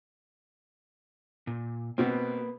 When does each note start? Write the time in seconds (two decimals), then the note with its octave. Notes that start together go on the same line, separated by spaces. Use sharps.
1.47 A#2
1.98 B2 A#3 C4 B4